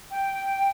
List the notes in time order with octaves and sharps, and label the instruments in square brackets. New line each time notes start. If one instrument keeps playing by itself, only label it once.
[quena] G5